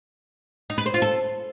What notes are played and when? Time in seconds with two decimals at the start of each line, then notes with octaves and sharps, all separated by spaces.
0.70 D#4
0.78 B4
0.86 C5
0.94 F4
1.02 A4